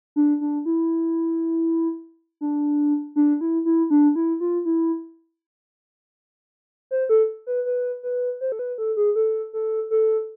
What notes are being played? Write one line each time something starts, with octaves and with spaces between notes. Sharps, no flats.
D4
D4
E4
D4
D4
E4
E4
D4
E4
F4
E4
C5
A4
B4
B4
B4
C5
A4
B4
A4
G#4
A4
A4
A4